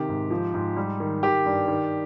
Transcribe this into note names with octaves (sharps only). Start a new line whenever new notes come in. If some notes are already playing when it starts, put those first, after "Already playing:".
Already playing: C3 D#3 G4
G#2
F3
G#2
G3
D#3
D#3 G4
G2
D#3